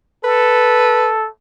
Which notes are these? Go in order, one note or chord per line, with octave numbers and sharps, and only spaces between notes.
A4 B4